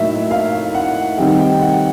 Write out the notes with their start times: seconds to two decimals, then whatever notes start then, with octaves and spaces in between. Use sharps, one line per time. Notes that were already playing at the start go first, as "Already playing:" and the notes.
Already playing: A2 F#3 A#3 D#4 E5
0.31 F5
0.74 F#5
1.18 D#3 G3 C4 D#4 G5
1.40 G5
1.61 F#5